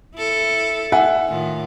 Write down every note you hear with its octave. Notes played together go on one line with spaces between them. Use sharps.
E4 A4
E5 F#5 G#5
A2 D#3 F4